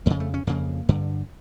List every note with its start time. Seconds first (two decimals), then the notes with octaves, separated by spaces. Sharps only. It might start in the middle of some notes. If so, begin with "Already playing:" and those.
0.06 F2 C#3 A#3
0.20 A3
0.34 C#4
0.47 F2 C#3 A#3
0.89 G2 D3